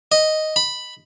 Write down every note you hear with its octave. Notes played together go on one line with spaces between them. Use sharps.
D#5
B5